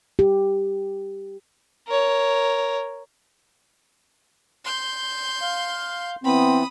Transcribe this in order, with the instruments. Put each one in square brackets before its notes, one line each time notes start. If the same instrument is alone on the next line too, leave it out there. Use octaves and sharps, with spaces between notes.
[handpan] G4
[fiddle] A#4 C#5
[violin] C6 G6
[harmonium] F5
[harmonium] E3 B3 [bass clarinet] C4 [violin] B5 D#6